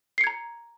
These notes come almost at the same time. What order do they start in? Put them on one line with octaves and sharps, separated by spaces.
C7 C#7 G#6 A#5